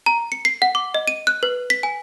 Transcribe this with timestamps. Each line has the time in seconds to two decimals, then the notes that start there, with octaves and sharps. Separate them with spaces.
0.06 A#5
0.32 C#7
0.45 C7
0.62 F#5
0.75 D6
0.94 D#5
1.08 D#7
1.27 F#6
1.43 B4
1.70 B6
1.83 G#5